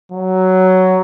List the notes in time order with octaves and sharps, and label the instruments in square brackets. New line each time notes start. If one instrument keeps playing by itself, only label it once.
[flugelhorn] F#3